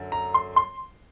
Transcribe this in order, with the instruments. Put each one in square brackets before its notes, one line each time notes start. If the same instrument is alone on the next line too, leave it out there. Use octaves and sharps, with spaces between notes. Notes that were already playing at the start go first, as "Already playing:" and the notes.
Already playing: [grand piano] F#2 D3
A#5
C6
C6